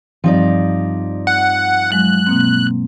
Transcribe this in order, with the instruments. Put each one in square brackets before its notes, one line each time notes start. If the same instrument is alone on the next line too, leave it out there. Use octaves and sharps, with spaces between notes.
[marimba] G2 G3 C4 [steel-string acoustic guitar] F3 D#4 D5
[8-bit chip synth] F#5
[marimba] F#3 G#3 [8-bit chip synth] F#6
[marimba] B2 A#3 C4